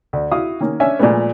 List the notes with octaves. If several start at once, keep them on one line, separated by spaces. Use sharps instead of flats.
D2
E4 F#4 F5 D#6
D#3 A#3 C#4
C#4 D4 E5 G#5
A#2 F3 G#3 A3 B3